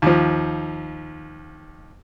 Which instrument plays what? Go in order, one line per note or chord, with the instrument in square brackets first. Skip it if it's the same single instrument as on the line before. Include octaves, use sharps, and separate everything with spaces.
[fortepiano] D#2 F3